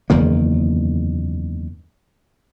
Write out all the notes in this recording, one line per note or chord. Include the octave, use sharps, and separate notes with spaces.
F#1 E2 D#3 A#3